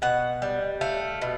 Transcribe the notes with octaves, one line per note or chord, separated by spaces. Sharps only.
B2 F#5
G3
A3 F5
B2